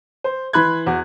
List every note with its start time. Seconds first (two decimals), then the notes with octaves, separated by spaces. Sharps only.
0.24 C5
0.53 E3 B5 C6 F#6 G#6
0.86 E2 F#4